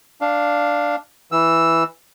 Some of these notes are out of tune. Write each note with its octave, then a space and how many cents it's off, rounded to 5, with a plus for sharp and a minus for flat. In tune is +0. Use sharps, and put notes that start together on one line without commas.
D4 +0 F5 +0
E3 +0 E6 +0